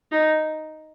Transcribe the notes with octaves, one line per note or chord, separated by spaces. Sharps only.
D#4